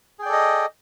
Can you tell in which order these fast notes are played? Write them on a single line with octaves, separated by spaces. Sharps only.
G#4 G5 D5 A4 D#5